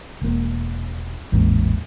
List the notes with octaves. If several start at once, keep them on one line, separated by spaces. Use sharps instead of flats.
E1 A#3
A1 E2 G#2 A#3